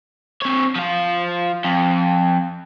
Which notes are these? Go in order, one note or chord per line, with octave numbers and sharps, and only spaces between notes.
C4 C#5
F3 F5
F2